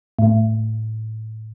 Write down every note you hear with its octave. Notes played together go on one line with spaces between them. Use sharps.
A2